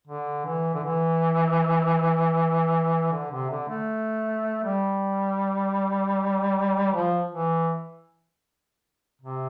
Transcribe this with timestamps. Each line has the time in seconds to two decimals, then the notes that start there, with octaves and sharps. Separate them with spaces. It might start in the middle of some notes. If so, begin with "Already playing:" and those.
0.07 D3
0.45 E3
0.74 D3
0.83 E3
3.12 D3
3.31 C3
3.50 D3
3.69 A3
4.64 G3
6.93 F3
7.31 E3
9.21 C3